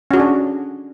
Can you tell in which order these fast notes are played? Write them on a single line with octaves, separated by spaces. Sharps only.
C#4 F#4 G#4 D4